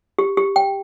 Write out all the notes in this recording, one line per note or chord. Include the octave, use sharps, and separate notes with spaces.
G4
G4
G5